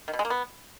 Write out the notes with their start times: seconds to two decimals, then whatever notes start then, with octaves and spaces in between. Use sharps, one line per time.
0.08 D#3
0.13 B2
0.19 G#3
0.25 A#3
0.30 B3